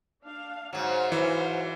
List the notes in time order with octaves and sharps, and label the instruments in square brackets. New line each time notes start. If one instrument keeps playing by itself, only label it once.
[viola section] D4 F5
[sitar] G#2 F#3 [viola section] C5 F5
[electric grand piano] E3